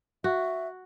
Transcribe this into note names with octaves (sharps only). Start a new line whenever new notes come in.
F#4 E5